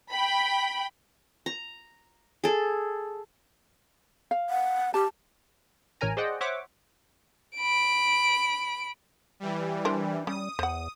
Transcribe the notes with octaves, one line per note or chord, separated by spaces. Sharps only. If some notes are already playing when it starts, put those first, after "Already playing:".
G5 B5
A#5
G#4 A4
F5
F#5
G4 A5
A1 C#4 A#4 G#5 A#5
G#4 C5 D5 D#5 F#5 G5
C5 C#5 E5 F#5 D6
B5 D7
E3 G3
D4 A#4 C5
G3 C#4 D#6
E2 C5 F#5